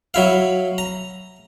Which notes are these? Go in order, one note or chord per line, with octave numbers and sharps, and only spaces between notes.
F#3 E4 F5
A#5